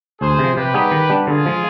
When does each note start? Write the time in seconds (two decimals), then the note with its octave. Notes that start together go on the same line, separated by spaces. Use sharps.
0.21 D2 G#4 C5
0.39 C3
0.44 F3
0.57 C3 G4 B4
0.74 G3 B3 D#4 G#4
0.91 D#3
1.10 G3 B3 D4
1.27 D3 F4 G#4
1.46 F3 G#3